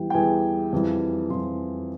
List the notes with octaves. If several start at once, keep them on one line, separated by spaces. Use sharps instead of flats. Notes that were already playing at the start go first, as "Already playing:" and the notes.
Already playing: E2 E3 G3 G4 G5
G5
E2 E3 G3 G#4 G#5
F2 E3 G3
F2 E3 G3 C5 C6